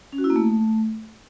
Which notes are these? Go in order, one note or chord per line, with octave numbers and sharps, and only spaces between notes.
C#4
F#4
E4
A#3
A3